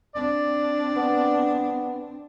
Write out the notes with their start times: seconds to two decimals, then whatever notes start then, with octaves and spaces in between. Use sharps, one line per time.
0.15 C4 D4 D5
0.96 B3